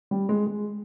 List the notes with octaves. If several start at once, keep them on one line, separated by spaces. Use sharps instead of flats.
G3
G#3
G#3